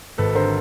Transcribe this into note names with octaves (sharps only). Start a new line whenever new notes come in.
G#1 A4 B4
D3 A#4 C5